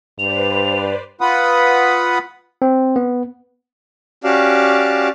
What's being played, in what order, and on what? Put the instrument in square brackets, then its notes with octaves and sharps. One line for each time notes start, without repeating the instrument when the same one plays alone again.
[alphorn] G2 [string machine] B4 C5 D5 [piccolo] F7
[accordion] F4 B4 F#5 B5 D#6
[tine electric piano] C4
B3
[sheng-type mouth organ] C#4 F#4 G4 D5 F5 A5